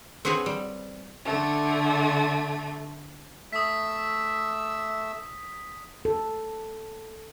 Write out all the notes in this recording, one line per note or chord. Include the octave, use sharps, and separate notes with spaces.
C4 F#4 G#4 B4 C#5
G3
D3 A3
A3 E5 D#6 E6 B6
A4